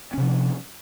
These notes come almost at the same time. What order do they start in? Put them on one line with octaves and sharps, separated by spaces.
C#4 C3 F3